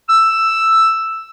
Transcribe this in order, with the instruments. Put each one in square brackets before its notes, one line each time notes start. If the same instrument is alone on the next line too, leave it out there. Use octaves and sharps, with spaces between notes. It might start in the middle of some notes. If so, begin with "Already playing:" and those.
[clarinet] E6